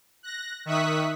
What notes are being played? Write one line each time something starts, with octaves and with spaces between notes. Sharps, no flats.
F#6 A#6
D#3 E5 C#6 D#6 F#6 B6